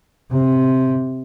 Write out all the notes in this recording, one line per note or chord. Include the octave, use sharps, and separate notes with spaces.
C3